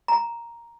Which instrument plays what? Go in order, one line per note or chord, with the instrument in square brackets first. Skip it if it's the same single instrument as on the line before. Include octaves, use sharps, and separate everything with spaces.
[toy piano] A#5